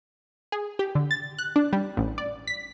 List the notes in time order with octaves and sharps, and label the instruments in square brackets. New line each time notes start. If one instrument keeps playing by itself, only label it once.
[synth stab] G#4
G4
D3
A6
F#6
D4
G3
A1
D5
B6